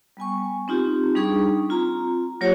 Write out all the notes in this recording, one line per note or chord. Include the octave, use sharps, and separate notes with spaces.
G3 B3 G#5 C#6
C4 D#4 F4 G4
G3 D4 D#4 G#4 C#6 D#6
C4 F4 A#5
F#3 A#3 F4 G4 C#5